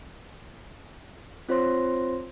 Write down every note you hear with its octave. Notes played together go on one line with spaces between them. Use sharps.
C4 F4 C5 C#5 C6 A#6